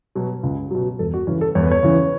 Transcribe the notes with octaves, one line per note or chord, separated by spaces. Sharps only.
B2 F#3
C#2
B2 F#3
E2 A4
F#4
C#3 E3 C#4
A4
E2 C#5
B4
C#5
C#3 E3